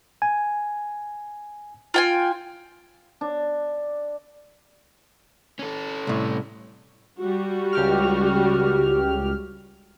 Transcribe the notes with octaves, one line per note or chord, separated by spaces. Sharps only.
G#5
F4 G5 G#5
D4
C#4 A4
C2 A2
G3 F#4
C#2 G4 F6